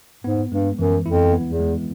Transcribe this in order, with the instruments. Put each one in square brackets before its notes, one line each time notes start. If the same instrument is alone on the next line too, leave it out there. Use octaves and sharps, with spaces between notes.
[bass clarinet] G#2 [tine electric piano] B3
[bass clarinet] G2 [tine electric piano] G#3
[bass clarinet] F#2 [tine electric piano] E3
[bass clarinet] F2 [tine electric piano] E4
[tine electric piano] B3
[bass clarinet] E2
[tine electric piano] G#3